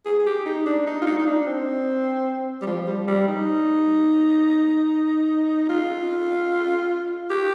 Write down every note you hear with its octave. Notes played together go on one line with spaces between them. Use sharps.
G#4
G#4
G4
D#4
D4
D#4
F4
D#4
D#4
D4
C4
G3
F3
G3
G3
D#4
F4
G4